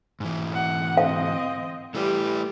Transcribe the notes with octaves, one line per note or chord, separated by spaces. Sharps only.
G#2 E3
F#5
C4 D#5 F5
G3 A3 E4 B4